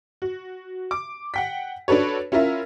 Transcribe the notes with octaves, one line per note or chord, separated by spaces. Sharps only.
F#4
D6
F#5 G5 B6
D4 F#4 A4 B4 C#5
C#4 E4 F4 A#4 E5